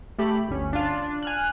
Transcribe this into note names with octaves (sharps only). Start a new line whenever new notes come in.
A3 G4 B5
G1 D2 C#4
D4 F4
D4
G#5 F6 F#6